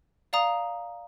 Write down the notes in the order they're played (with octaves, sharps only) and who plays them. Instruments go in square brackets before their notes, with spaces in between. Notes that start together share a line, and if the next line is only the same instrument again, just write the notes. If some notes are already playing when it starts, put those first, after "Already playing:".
[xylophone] D5 F5 A#5 D#6